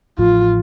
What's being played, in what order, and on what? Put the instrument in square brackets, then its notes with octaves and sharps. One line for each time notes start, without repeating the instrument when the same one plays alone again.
[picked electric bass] A1 A2 F3 [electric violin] F4